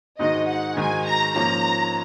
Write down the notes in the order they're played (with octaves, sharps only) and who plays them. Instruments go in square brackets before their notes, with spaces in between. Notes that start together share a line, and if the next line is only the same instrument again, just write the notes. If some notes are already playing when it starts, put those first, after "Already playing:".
[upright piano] G#2 D#3 G#3 D#4 F#4 [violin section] D#5
[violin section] F#5
[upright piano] G#2 D#3 G#3 D#4 F#4 [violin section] G#5
[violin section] A#5
[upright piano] G#2 F3 A#3 C#4 [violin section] A#5